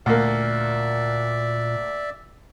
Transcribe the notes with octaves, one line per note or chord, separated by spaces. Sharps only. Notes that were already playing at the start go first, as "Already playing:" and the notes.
D2 A#2 A#3 D5 E5